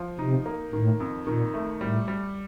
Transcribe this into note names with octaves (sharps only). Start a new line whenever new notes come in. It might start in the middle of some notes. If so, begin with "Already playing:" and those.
Already playing: F3
C3 D#4
A#3
A2 D#3
F2
A#2 D#3
A3
A2 G3
G3